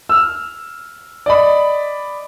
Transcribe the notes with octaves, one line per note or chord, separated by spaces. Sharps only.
E6 F6
D5 D#5 B5